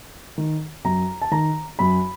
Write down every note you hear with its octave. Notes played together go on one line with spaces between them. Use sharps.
D#3
F#2 A#5
A5
D#3 A#5
F#2 B5